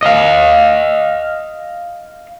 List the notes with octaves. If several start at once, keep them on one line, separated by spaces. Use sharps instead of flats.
D#5 F5